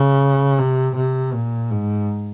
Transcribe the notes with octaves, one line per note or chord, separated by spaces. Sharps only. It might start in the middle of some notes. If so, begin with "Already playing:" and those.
Already playing: C#3
C3
C3
A#2
G#2